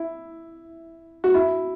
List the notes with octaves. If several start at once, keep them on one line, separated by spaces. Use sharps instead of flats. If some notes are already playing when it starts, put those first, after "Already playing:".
Already playing: E4
F#4
E4